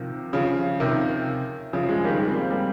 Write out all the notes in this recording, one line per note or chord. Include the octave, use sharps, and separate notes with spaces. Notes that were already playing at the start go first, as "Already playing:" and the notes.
Already playing: C3 D#3 F3
C#3 F3
C3 D#3
C#3 F3
F3 G#3
D#3 G3
F3 G#3
C4
G3 A#3
G3 A#3